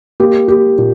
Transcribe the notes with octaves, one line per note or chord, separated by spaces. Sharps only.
A#3 G4
A#3 G4
A#2